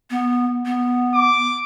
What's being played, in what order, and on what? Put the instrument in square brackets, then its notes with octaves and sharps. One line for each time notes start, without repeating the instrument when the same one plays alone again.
[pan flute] B3
B3
[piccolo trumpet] D6